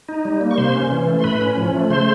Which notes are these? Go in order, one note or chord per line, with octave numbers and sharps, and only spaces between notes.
D#4
G3
A#3
C#6
C3 C5 C6
C#4
E3
A3
C6
A2 B4 B5
C#4
F3
A3
C#3 C5 C6